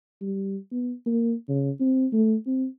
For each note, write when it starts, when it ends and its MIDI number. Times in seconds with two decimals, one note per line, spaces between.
0.21 0.57 55
0.72 0.93 59
1.06 1.34 58
1.49 1.71 49
1.80 2.06 60
2.13 2.36 57
2.47 2.67 60